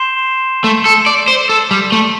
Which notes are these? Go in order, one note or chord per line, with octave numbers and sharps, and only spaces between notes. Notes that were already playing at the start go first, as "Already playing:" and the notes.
Already playing: C6 G6 C7 E7 G7
A3
A4
D5
C5
A4
G3
A3